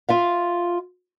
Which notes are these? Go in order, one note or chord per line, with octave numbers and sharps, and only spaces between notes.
F4 E5 F5